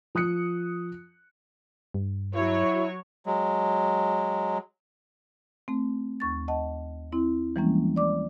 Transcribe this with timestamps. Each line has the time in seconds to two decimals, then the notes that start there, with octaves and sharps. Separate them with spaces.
0.15 F3 D#6 F#6 C#7
1.94 G2
2.35 F#3 E4 C#5
3.26 F#3 G#3
5.68 A3 C4
6.20 D#2 C#6 A6
6.48 D#5 F#5 A5
7.12 C4 E4
7.56 E3 F3 G3 G#3 A#3 C#4
7.96 D5 D6